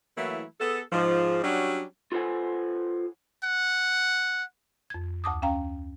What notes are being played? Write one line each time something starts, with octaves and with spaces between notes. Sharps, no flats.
E3 F#3 A3 A#3 E4
B3 G#4 A4
G#2 F3
F#3 G3 C#4 D4 F#4
F4 A4 B4 C5 F#5 G#5
F#5
F2 G#6
D2 A5 D6 D#6
C#4 F5 G5 A#5